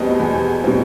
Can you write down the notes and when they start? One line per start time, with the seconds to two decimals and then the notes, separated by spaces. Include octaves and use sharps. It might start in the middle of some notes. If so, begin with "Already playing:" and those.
Already playing: E2 B2 G3 C4 D#5
0.19 E2
0.64 B2 G3 C4